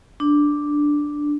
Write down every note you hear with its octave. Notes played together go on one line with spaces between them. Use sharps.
D4